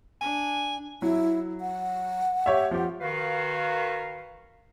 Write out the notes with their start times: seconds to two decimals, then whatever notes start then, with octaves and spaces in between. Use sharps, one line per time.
0.21 D4 G#5
1.02 F#3 E4
1.61 F#5
2.46 G4 C#5 E5
2.71 F3 G4
3.01 D#3 F#4 B4 F5